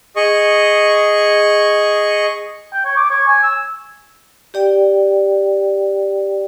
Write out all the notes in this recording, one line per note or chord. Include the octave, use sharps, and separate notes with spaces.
G#4 D#5 C#6
G5
C#5
D6
C#5
G#5
E6
G4 D5 G5